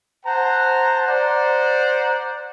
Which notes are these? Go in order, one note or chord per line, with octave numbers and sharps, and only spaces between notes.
C5 F#5 A5 A#5
C5 D5 F#5 A#5